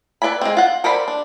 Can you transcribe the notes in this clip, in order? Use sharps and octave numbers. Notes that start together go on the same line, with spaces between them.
A4 B4 D5 G#5 B5
G#3 C4
F4 F#5
A4 A#4 C5 D5 B5
D4